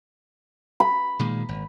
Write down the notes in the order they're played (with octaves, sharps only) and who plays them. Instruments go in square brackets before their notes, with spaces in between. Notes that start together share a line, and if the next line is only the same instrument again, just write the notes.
[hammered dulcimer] B5
[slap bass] A#2 D#3 G#3
G#1